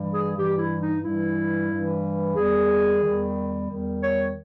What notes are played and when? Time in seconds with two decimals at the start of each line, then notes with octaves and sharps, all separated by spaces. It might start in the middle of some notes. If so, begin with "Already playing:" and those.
Already playing: G2 E3 G3
0.14 G#4
0.37 G2 E3 G3 G4
0.59 E4
0.81 D#4
1.03 G2 E3 G3 E4
1.70 G2 E3 G3
2.35 E2 D#3 G3 G#4
3.02 E2 D#3 G3
3.69 E2 D#3 G3
4.02 C#5